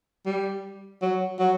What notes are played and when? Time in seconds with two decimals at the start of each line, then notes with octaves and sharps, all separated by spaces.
0.26 G3
1.02 F#3
1.39 F#3